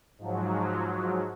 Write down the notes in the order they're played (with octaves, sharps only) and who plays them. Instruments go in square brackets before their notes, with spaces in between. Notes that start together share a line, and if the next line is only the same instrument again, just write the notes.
[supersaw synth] G#2 F3 F#3